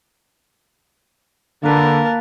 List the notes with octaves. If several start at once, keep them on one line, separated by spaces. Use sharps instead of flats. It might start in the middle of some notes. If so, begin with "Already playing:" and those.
D3 A#3 A#4 B4 A5